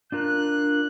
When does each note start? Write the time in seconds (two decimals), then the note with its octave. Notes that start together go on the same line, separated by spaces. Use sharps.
0.12 D4 F4 A#4 F#6